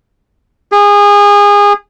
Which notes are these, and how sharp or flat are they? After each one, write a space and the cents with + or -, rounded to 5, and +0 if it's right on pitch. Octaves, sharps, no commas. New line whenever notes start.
G#4 -25